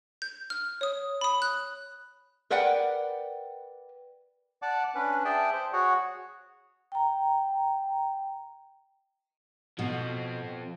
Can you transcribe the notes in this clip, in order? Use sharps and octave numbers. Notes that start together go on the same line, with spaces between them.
G6
F6
C#5 D#6
B5 D#6
F#6
A#4 B4 D5 F#5 G5
D5 F#5 A5 D6
C#4 D4 B4
G#4 D5 E5 G5 A5
C5
F#4 G#4 C#5 F#5
G5 A#5
B2 F3 C4